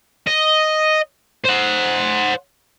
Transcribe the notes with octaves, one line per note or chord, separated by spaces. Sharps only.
D#5
C5 F#5